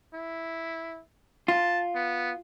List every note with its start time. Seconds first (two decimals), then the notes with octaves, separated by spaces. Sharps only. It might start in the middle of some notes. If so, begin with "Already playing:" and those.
0.14 E4
1.48 F4 A5
1.95 B3